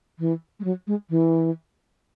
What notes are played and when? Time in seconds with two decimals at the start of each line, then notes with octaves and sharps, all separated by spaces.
0.19 E3
0.60 G#3
0.64 F#3
0.87 G#3
1.10 E3